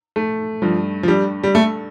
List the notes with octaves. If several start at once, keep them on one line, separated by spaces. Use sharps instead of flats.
A3
G2 F3
F3
G3 D4
G3
A3 A4